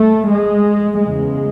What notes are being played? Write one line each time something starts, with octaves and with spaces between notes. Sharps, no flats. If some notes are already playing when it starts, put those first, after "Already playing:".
Already playing: A3
G#3
E2 C#3 G#3